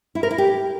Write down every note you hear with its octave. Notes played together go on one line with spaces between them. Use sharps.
E4
A#4
E4
G4